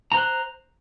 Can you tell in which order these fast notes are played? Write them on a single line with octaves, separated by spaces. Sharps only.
A#5 C5 F#6